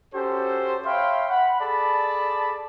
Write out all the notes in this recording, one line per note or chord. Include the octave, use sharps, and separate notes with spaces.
C#4 F#4 G4 A4 C5
C#5 E5 F5 G5 B5 C6
F#5 B5
G#4 A4 D5 A5 B5